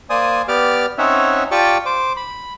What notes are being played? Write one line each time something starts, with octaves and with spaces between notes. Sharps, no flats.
A#3 C5 D5 G#5 D#6
B3 G4 D5 D6 F6
C4 C#4 D#4 C#5 E5 F#5
F4 G4 D5 G5 A5 C#6
C5 D6
B5